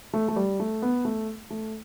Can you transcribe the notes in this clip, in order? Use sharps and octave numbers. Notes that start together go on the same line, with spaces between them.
A3
A3
G3
A3
B3
A3
A3